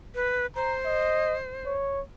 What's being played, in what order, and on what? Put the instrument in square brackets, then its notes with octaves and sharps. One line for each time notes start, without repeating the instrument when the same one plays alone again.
[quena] B4
[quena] C5 [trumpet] A#5
[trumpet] D#5
C#5